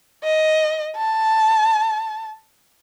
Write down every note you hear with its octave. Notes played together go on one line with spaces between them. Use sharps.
D#5
A5